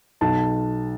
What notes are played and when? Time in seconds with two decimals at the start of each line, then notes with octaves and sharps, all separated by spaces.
0.21 B1 A5